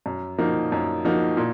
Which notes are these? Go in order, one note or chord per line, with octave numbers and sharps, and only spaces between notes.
F#2
F3 A#3 D#4 F#4
F#2
F3 A#3 D#4 F#4
A#2